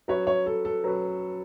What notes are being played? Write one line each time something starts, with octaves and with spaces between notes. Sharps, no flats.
F#3 C#4 F#4 B4 C#5
C#5
A4
A4
F#3 C#4 F#4 B4